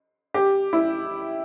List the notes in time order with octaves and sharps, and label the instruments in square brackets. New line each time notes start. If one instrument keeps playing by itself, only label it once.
[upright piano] G4
E4